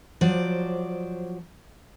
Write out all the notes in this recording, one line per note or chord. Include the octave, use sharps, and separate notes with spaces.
F3 F#3 C5 D5